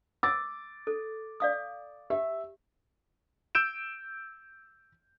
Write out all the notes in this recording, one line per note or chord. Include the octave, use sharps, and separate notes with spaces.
D6 E6 A6
A4
D5 F5 D#6
G4 E5
E6 G6 D7 E7